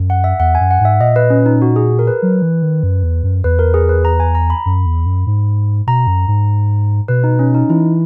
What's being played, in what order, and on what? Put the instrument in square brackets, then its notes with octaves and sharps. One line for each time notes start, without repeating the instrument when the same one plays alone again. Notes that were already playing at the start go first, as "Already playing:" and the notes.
Already playing: [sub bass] F#2
[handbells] F#5
E5
[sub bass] E2 [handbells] F#5
[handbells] G#5
[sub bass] F#2
[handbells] F#5
[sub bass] G#2 [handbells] E5
[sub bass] A#2 [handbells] D#5
[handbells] B4
C#4
D#4
F#4
G#4
A#4
B4
[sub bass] F#3
E3
D#3
F#2
E2
F#2
[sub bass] E2 [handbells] B4
[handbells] A#4
G#4
B4
A#5
G#5
A#5
B5
[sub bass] F#2
E2
F#2
G#2
[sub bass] B2 [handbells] A#5
[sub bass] F#2
G#2
[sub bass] B2 [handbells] B4
[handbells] D#4
C#4
D#4
[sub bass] E3 [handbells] E4